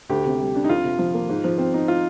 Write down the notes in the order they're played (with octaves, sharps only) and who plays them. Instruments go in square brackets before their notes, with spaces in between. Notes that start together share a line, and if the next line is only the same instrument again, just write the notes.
[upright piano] D2 [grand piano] G4
[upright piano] C3
G3
D4
[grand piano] D#4
[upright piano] F2 [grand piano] F4
[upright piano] C3
F3
A#3
G#2
F3
C4
D#4
[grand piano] F4